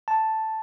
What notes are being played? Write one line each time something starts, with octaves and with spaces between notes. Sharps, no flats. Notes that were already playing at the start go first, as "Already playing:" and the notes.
A5